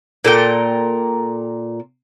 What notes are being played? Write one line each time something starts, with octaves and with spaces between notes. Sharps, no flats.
A#2 A4 A#4 G5